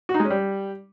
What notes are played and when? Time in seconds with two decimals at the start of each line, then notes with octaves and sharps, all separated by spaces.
0.09 F#4
0.14 D#4
0.20 G#3
0.25 C#4
0.30 G3